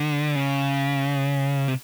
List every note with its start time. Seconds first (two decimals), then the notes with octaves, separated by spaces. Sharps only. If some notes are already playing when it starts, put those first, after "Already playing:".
Already playing: D3
0.35 C#3
1.68 C3